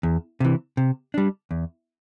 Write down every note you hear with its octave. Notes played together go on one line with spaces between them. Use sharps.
E2
C3 E3
C3
G3 D4
E2